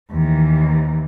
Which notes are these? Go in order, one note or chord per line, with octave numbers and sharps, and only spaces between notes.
D#2 E3